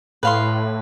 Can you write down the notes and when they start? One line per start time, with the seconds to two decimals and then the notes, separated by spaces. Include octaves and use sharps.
0.23 A2 B4 F5 C6